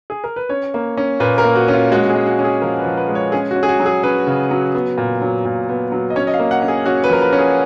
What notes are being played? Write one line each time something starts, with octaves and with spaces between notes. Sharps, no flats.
G#4
A#4
B4
C#4 C#5
A#3
C#4
A#2 B4
A#4
A#3
F#4
C#4
F4
G#3 F#4
F#4
G#4
G#3
F#4
C#4
G#4
F3 A#4
B4
F3
B4
G#3
C#5
C#4 G#4
F#4
C#4
G#4
F#4
F#3
G#4
C#4 B4
C#3
F#3
B3
A#2
F#3
A#2
B3
F#3
D#5
C#4 C#5
D#5
F5
A#3
F#5
C#4
G#4
C#4 F#4
B4
F3 A#4
B4
C#4
G#4